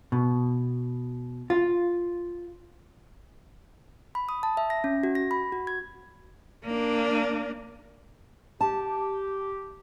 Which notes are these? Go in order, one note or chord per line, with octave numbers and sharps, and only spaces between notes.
B2
F4
B5
D#6
A5
E5
A#6
C#4
F#4
A#6
B5
F#4
G#6
A#3 D4
G4 A5